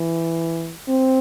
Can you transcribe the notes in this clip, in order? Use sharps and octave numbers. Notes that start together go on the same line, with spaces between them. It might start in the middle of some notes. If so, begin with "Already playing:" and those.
Already playing: E3
C4